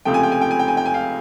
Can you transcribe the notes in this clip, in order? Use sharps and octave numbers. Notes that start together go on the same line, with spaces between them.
C#2 C3 F3 A3 G5
G#5
G5
G#5
G5
G#5
G5
G#5
G5
G#5
F5 G5